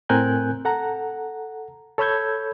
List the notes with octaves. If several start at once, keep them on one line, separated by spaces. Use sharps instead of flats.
A2 C4 A#4 G#5 F#6 G6
A4 F#5 A#5
A4 C#5 B5 E6 G6 G#6